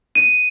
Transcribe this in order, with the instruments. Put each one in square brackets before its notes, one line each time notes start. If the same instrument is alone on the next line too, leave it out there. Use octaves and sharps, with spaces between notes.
[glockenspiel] D#7